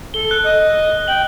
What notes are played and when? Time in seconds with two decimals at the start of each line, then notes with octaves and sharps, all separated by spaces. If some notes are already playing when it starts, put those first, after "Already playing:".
0.14 A4 G7
0.31 F#6
0.44 D#5
1.08 G5 F#7